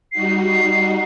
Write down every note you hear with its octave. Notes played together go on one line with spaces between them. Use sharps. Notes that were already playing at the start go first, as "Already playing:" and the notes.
G3 D#4 F#4 C7